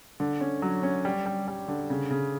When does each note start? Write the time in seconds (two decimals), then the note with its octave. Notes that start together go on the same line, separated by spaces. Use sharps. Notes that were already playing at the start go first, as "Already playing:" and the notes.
0.20 D3
0.41 C#4
0.62 F#3
0.83 C#4
1.05 G3
1.26 G3
1.48 G3
1.68 D3
1.90 C#3
2.11 C#3